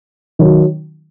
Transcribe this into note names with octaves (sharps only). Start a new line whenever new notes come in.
D#3 F#3